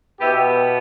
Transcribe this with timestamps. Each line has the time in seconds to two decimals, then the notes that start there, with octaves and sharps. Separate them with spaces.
0.19 B2 B3 E4 G4